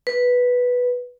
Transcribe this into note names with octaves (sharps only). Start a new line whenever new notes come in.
B4